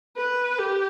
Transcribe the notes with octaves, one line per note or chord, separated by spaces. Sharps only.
B4
G4